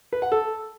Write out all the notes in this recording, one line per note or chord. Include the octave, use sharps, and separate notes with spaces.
B4
F#5
A4